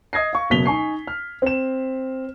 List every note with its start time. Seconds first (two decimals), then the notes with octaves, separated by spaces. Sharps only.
0.13 D#5 D#6 G#6 A#6 C7
0.33 F5 C#6
0.50 F#1 B2 F#3 B6 F7 G7
0.65 D#4 G#5 C#6 C7
1.07 F6
1.42 C4 E7